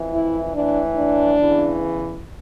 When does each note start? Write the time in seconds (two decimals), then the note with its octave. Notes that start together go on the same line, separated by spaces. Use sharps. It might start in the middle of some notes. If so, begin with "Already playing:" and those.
Already playing: F2 E3
0.13 E4
0.54 A2 E3 D4
0.96 D4
1.37 E2 C#3 E3